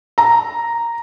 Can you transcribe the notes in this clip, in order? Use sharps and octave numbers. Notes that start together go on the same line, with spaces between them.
A#5